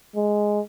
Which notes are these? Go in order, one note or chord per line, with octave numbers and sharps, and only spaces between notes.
G#3